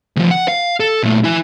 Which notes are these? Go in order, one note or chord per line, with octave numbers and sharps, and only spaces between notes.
D2 F3
F#5
F5
A4
A#2 A3
E4 G#5